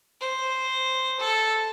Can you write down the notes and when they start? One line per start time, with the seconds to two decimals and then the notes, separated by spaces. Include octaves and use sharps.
0.21 C5
1.20 A4